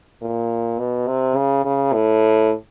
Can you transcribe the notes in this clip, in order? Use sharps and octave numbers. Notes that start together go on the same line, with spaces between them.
A#2
B2
C3
C#3
C#3
A2